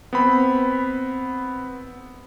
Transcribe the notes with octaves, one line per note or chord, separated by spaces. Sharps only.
B3 C4 B5